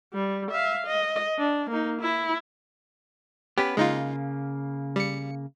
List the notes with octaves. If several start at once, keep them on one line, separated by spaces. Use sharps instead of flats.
G3
E5 F5
D#5
D4
A#3 D#4
E4
B3 C#4 G4 B4
C#3 G#3 A#3 D#4 F4
G3 C#7